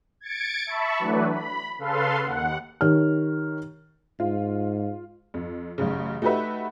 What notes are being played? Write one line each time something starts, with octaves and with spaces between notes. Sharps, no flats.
G#6 A6 C#7 D7
E5 A5 B5 C#6
E3 F#3 A3 D4 B4
B5
C#3 A4 B4 F5 C6
D#2 F#5
D#3 G4 C#5 F6
G#2 F4
F2
A1 F#2 C#3
A3 D#4 F#4 G4 B4 E5